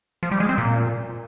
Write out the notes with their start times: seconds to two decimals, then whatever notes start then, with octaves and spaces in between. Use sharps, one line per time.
0.23 F3
0.31 G3
0.40 G#3
0.49 C4
0.58 A#2